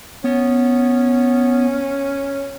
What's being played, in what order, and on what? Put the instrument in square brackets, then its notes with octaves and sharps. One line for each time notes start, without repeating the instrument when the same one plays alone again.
[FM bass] B3 [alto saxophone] C#4